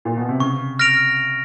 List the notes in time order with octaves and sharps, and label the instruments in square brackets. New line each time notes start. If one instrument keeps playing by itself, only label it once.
[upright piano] A#2
B2
C3
[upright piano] C#3 [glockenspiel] C#6
[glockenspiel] F6 A#6 D7 F7